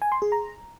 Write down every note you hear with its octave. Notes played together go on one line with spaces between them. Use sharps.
G#5
C6
G#4
A#5